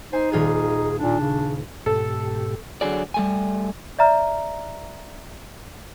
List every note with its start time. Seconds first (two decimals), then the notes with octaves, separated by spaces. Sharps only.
0.13 D#4 C5 G#5
0.32 D#1 F4 G#4 G#6
0.99 A#2 D4
1.20 C#3
1.86 G#2 B2 G4 A4
2.81 D3 F#3 G#4 D5
3.14 G3 A3 G#5
3.99 D5 E5 A#5 F6